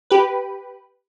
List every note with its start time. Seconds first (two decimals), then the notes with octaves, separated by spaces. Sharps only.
0.10 G4 B4